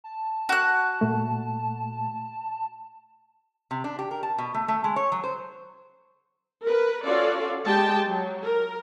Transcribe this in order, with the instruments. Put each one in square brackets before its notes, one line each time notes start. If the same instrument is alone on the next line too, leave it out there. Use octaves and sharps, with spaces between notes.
[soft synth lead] A5
[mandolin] F#4 F#6
[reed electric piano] A#2 A3
[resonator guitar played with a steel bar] C3
D4
G4
A#4
A5
B2
A3
A3
G#3
C#5
F#3
C5
[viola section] A#4 B4
C#4 F4 F#4 A4 D5 F5
G#3 G4 G5 A5
F#3
A#4